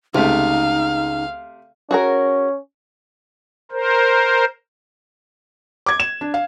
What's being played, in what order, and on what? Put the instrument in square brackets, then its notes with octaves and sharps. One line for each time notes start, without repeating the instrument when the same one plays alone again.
[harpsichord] C#2 [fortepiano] C3 A3 [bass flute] D#4 [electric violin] F5
[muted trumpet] C#4 [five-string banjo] F#4 G#4 A#4
[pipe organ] A#4 C5
[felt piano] D6 G#6
E7
D4
F5